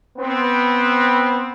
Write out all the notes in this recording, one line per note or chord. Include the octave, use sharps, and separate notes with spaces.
B3 C4